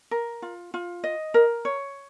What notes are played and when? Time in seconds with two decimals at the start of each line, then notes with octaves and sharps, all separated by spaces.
0.11 A#4
0.42 F4
0.74 F4
1.04 D#5
1.34 A#4
1.65 C#5